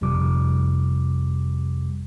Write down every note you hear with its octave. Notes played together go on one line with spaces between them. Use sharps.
G1 F2 C3 G3 D6